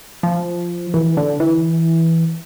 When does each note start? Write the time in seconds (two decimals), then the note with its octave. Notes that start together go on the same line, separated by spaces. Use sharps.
0.23 F3
0.94 E3
1.17 D3
1.40 E3